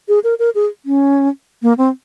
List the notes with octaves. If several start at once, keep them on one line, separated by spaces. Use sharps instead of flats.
G#4
A#4
A#4
G#4
C#4
A#3
C4